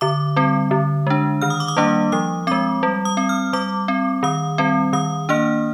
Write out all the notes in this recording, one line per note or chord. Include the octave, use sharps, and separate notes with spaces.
D3 D6
G3 C4
D3
G#3 D4
D#3 F6
D#6
D6
D#6
G3 A#3 D4
F3 D#6
G#3 C4 D6
G3
D#6
C4
F6
G3 D6
C4
D#3 D#6
G3 C4
D#3 D#6
A#3 D4 F6